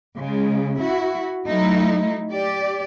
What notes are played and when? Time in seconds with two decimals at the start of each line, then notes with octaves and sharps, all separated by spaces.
0.17 C#3 G#3
0.79 E4 F#4
1.45 F#3 A3 D#4 E4
2.31 G4 D5